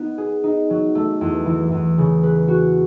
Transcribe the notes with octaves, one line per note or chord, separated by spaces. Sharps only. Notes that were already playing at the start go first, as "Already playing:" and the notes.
Already playing: B3 D#4
G#4
D#4
F#3
A3
E2
E3
E2
C#3
B4
F#4